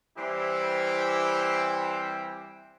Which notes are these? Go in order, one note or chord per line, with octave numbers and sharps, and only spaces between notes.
E3 G3 C4 E4 G4